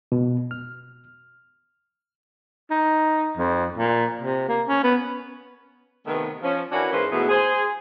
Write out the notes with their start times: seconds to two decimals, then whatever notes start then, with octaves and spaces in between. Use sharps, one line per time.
0.12 B2
0.51 F6
2.70 D#4
3.37 F2
3.78 A#2
4.22 C3
4.49 A#3
4.68 C#4
4.84 B3
6.07 C3 D#3 A3 B3
6.43 F3 C#4
6.72 E3 C#4 D4 F#4 A#4 B4
6.92 G#2 E3 A#3 C#4 B4 C5
7.12 G#2 B2 E3 A3 B3 G#4
7.29 G#4 C5